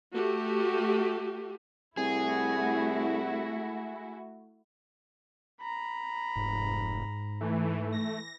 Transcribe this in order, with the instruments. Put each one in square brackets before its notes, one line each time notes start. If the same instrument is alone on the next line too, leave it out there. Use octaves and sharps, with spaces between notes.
[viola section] A3 F#4 G4
[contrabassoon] C2 [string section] A3 E4 F#4 [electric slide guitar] G#4
[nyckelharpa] A#5 B5
[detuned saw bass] F1 [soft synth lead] G#2
[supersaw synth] E3 [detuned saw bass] A3
[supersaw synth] A#6